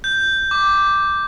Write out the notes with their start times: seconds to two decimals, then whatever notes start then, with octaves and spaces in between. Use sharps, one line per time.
0.04 G6
0.51 D6